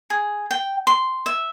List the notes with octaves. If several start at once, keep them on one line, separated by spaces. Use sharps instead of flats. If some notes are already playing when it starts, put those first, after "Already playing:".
G#4
G5
C6
E5